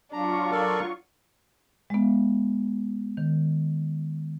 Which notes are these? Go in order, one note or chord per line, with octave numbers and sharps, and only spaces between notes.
F#3 D4 F4 A#5 C#6
A4 A#4 D5
G#3 B3
D#3